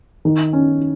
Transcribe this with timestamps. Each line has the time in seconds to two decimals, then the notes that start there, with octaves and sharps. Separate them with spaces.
0.25 D#3
0.53 C#4